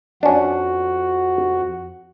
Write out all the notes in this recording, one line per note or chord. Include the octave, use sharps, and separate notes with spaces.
F2 C#4 D4 F#4